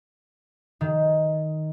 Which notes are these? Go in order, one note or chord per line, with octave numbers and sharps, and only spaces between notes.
D#3